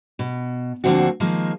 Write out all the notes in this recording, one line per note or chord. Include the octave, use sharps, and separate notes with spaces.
B2
D2 D3 F3 A#3 C4 F#4
D#3 F3 G#3 A#3